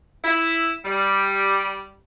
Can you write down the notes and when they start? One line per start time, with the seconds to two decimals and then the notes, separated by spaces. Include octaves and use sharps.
0.24 E4
0.84 G3